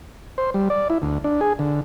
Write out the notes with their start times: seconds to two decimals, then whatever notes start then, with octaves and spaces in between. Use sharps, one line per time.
0.38 C5
0.54 G3
0.70 D5
0.90 E4
1.02 D2
1.24 D4
1.41 G#4
1.59 D3